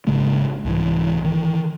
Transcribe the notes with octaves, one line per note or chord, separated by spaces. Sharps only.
G#1 C#3 G#3 A#3
C2 G#2 E3
D#3 E3